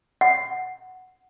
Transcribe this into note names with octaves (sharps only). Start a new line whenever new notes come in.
F#5